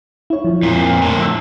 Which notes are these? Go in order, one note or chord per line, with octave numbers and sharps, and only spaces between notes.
E4 C#5
F3
F2 A#2
A2 D3
E5 E6